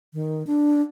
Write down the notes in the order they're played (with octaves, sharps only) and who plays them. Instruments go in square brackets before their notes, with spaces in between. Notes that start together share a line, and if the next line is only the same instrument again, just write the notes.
[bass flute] D#3
D4